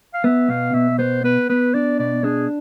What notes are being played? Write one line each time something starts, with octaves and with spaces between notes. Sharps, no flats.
F5
B3 E5
B2 F5
B2 E5
B3 C5
B3 B4
B3 B4
D4 D5
B2 D5
D4 G#4